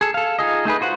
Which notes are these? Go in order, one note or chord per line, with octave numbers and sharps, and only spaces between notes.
G#4 A4
A4 F5
D#4 F4 G#4 D#5
A3 D#4 G#4 B4
F4 F#4 C5 F#5